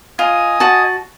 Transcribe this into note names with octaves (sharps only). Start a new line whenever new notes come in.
F4 D#5 G#5 D#6
F#4 A5